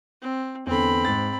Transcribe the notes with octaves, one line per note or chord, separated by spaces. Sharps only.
C4
E2 D3 C4 B5
G#2 A6